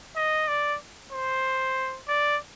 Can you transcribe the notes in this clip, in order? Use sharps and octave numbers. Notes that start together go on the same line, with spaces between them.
D#5
D5
C5
D5